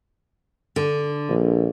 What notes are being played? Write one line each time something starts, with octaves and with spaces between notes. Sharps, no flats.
D3
A#1